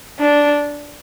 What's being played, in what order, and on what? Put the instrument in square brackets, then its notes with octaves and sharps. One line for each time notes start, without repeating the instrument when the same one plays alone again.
[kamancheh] D4